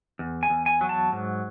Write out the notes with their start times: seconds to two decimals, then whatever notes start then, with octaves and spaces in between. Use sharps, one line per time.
0.19 E2
0.43 G#5
0.50 E2
0.66 G#5
0.81 F#3
0.89 A5
1.12 G#2